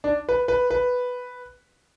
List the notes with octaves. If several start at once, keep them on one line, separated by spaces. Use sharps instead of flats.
D4
B4
B4
B4